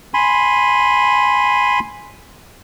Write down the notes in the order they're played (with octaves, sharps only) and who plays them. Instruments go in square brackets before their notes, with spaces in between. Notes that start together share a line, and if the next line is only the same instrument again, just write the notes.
[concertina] G#5 B5 C6